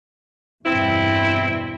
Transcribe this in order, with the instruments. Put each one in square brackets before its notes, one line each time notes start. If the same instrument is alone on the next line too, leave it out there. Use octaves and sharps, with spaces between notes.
[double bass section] E2 G2 B2 [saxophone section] C4 E4